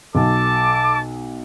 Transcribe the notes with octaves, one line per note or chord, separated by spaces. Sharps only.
B1 A4 A5 D6